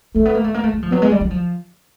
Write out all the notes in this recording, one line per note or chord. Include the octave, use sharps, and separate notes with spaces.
A3 A#3
B3
A#3
A3
A#3
A3
G#3
F3
F#3 B3
G#3
G3
F#3
F3